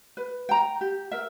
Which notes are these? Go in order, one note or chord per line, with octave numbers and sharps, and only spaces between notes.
B4
G5 A#5
G4
A#4 E5